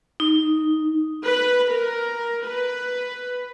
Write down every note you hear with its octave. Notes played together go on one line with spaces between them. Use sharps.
D#4
B4
A#4
B4